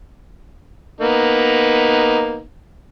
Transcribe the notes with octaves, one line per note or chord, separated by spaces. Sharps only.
A#3 B3 D#4